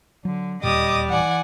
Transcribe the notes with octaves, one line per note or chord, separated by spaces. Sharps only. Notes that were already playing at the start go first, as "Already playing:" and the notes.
D3 F#3
D1 D#2 A#2 G3 D#5 D6 D#6
E3 D5 F#5 G#5